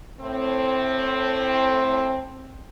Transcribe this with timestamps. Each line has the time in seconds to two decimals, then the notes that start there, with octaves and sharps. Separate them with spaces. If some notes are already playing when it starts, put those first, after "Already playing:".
0.21 A2 C4